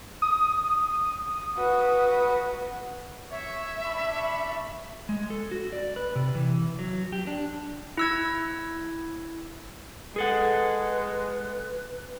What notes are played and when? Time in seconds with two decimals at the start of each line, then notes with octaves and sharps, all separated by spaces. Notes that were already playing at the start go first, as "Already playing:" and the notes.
0.22 D#6
1.57 F#4 B4
3.31 C#5 E5
3.84 D4 B5 C#6
5.09 G#3
5.30 A4
5.51 F#4
5.72 D5
5.96 B4
6.16 C3
6.35 E3
6.79 F#3
7.12 G4
7.27 D4
7.97 E4 E6 G#6
10.16 G#3 G#4 A4 B4 F#5